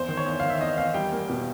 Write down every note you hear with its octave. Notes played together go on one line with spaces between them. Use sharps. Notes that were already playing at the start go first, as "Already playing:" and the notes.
Already playing: E2 C5
D#3
C#5
E2
D#3 F5
E5
E2 D#5
E2 F5
G3 G5
A#3
B2